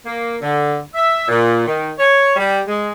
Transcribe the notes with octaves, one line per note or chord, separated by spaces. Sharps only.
A#3
D3
E5
A#2
D#3
C#5
G3
G#3